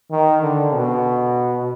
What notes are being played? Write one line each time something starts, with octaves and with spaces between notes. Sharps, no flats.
D#3
D3
B2